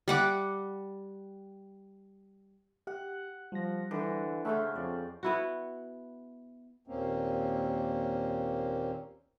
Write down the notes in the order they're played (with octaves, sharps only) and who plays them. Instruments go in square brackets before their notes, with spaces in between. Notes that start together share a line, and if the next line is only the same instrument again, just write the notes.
[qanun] G3 F#5 D6
[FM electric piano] G4 [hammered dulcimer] F#5
[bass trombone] F3 [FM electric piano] G3 A#6
[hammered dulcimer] D3 C5 [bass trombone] E3
[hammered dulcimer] C#3 C#4 C5 [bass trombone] A3 [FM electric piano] E5 F#5
[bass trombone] F2 [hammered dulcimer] D5
[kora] B3 E4 F#4
[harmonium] D#2 A#2 A#3 C4 C#4